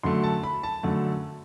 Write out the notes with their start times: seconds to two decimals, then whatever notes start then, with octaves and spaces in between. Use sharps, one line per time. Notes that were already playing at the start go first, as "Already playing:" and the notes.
0.03 F#2 D3 A3 C6
0.23 A5
0.44 B5
0.63 A5
0.83 F#2 D3 A3